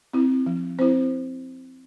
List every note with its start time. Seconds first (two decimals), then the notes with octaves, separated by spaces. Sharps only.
0.13 C4 E4
0.46 F3
0.79 C4 E4 C5